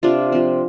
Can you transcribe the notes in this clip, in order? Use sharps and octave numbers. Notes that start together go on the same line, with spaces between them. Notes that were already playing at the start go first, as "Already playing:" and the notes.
C3 D4 F4
F3 C4